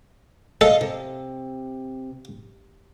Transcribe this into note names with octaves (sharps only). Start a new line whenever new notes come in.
A4 D#5 F5
C3